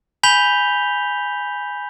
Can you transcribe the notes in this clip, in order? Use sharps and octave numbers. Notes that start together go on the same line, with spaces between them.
G#5 B5 G6 B6 F7 G7